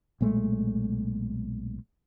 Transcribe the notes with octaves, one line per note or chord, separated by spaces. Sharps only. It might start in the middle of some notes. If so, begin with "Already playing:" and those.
B1 A#2 G#3 A3